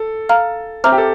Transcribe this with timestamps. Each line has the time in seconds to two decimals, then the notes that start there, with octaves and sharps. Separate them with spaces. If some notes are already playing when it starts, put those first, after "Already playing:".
Already playing: A4
0.29 F5 A#5 F6
0.84 C4 C5 E5 A#5 D6 F6
0.92 G4
0.98 A4